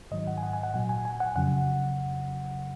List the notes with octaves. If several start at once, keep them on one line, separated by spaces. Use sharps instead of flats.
G#2 D#3 F#3 D#5
F#5
G#5
F#5
G#5
F#5
A#2 F#3 F#5
G#5
G#5
F#5
F2 C#3 F#3 F#5